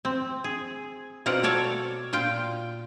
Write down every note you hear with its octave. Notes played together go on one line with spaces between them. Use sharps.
C4
G#4
B2 C4 F4 A#4 D5 F#5
F#4 A4 C#5 D5 A5
A#2 F4 G5